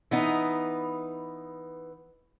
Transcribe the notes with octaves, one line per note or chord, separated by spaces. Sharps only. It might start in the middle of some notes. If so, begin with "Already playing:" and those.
E3 B3 D#4